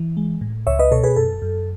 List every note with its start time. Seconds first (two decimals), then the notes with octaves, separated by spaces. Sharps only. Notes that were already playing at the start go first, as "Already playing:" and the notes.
Already playing: E3
0.17 G#3
0.41 A2
0.67 C#2 C#5 E5
0.79 B4 D#5
0.92 B2 A4 C#5
1.04 G#4 B4
1.16 F#2 A4
1.42 F#2